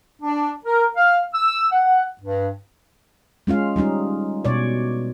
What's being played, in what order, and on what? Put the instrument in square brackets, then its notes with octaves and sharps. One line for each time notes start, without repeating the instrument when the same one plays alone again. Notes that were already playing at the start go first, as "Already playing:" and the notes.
[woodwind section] D4
A#4
F5
E6
F#5
G2
[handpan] G#3 C#4 F4 F5
G3 C#4 D#4 F4
B2 C#5 D5